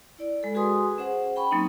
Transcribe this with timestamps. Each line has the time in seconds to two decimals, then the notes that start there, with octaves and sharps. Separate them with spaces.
0.19 E4 D5
0.43 G#3 A4
0.55 F#4 G#4 B4 G#5 C6 D#6
0.98 C#4 G#4 C5 F#5
1.36 G5 B5 C#6
1.51 F#3 A#3 C4 C#4 D#4